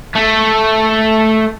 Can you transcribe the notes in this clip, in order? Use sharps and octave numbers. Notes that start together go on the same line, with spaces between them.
A3